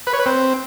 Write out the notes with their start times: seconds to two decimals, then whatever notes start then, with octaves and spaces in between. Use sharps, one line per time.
0.07 B4
0.13 C#5
0.20 B4
0.26 C4